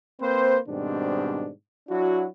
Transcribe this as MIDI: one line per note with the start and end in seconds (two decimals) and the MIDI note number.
0.21 0.57 58
0.21 0.57 60
0.21 0.57 71
0.21 0.57 72
0.68 1.50 44
0.68 1.50 47
0.68 1.50 51
0.68 1.50 55
0.68 1.50 60
0.68 1.50 62
1.89 2.27 54
1.89 2.27 62
1.89 2.27 64
1.89 2.27 66